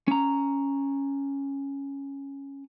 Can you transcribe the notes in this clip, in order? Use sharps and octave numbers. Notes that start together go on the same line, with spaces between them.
C#4 A#5